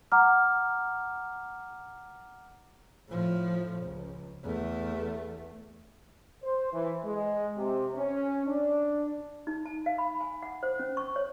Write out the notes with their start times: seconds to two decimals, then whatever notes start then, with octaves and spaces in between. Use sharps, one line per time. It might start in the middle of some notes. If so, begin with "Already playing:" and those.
0.12 F#5 A#5 D6 F6
3.09 A2 F3
3.82 C#2
4.44 E2 A3
6.43 C5
6.72 E3
7.04 G#3
7.55 C3
7.94 C#4
8.47 D4
9.47 D#4
9.65 A5
9.86 F5
9.98 B5
10.21 G#5
10.43 F#5
10.63 C5
10.79 C#4
10.97 C#6
11.16 C#5